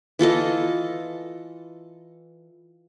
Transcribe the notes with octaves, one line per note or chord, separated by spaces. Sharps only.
E3 F4 A4 D#5